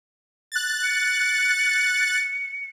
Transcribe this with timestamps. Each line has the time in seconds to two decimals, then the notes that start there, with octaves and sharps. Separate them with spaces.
0.52 F#6 A6
0.83 C#7